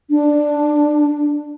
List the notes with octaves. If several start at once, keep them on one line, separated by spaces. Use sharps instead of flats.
D4